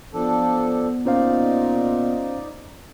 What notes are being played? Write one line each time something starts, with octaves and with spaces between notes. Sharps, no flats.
F3 B3 D4 A4
A#2 C#4 D#4 C5 D5 F5